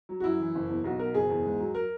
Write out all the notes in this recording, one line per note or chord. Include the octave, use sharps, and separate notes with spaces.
F#3
F#4
F#2 E4
E3
F#1
E2
B1 F#4
B2 A#4
F#1 G#4
E2
G#2
F#3
A#4